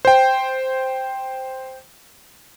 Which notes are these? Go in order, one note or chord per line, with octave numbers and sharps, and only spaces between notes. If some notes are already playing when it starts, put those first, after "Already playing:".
C5 G5